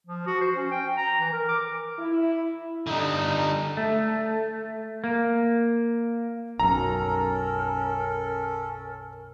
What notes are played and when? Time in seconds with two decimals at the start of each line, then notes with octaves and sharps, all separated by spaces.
0.06 F3
0.26 F#4
0.41 C5
0.55 C#4
0.71 G5
0.97 A#5
1.20 E3
1.32 A#4
1.48 D6
1.99 E4
2.87 D3 G3 D#4
3.77 A3
5.04 A#3
6.59 B1 F#2 C#4 A4 A#4 A#5